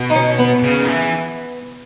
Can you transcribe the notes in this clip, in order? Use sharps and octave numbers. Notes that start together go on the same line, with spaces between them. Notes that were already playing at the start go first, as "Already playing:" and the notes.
Already playing: B2
D#4
C#4
B3
C#3
D#3
E3